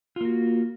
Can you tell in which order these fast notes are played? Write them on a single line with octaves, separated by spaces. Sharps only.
F4 A#3 F#4